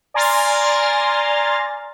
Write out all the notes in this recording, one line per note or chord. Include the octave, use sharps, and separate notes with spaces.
D5 G#5 A#5 C6 F6 A6